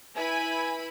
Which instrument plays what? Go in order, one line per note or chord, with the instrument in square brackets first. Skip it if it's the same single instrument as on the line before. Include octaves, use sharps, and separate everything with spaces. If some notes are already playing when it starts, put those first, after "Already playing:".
[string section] E4 B4 B5 [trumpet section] G#5